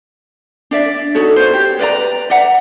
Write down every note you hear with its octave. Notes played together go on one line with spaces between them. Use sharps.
D4 D5 E5
D#4 F#4 A4 C#5
C5 C#5
G4
B4 D5 D#5 A#5
D5 E5 F#5 A#5